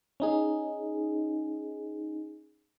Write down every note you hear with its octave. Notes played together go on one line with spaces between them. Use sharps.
C#4 D#4 G#4